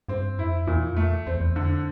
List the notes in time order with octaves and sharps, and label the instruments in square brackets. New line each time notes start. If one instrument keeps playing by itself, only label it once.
[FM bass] G2 [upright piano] C4
[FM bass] F2 [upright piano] E4
[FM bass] E2 [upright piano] A#2
[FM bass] F2
[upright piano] A3
[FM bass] E2
[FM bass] E2 [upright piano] C4
[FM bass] E2
[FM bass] F2 [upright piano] D3